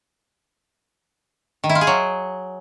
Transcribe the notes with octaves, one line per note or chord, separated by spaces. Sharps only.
D#3
E4
F4
G#4
F#3